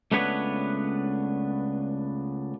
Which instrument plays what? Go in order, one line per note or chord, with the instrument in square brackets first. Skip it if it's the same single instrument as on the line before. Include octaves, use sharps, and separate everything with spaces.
[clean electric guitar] C#2 A3 B3 D4 B4 C#5